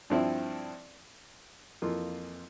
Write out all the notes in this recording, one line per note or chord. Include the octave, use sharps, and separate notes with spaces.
G2 F3 C4 E4
F2 E3 A#3 F4